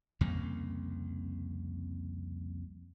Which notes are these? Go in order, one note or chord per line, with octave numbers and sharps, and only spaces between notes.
C2 F2 C#3 A#3